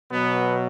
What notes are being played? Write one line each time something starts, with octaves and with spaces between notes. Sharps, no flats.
B2 F#3 B3